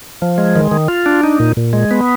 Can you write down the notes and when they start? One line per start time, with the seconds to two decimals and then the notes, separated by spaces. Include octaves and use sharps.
0.22 F3
0.38 G#3
0.56 D#3
0.71 D#3
0.88 F4
1.06 D4
1.23 D#4
1.40 A#2
1.57 A#2
1.73 G#3
1.91 B3